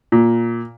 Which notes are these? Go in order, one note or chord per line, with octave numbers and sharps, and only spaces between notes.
A#2